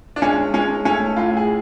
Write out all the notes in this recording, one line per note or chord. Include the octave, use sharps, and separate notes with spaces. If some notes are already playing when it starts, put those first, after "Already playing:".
D4
G#3 C#4
G#3 C#4
A3 C#4
A2 F4
G#4